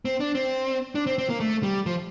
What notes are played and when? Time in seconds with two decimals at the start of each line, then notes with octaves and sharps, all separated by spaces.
0.05 C4
0.20 D4
0.35 C4
0.95 D4
1.07 C4
1.18 C4
1.30 A#3
1.40 A3
1.63 G3
1.86 F3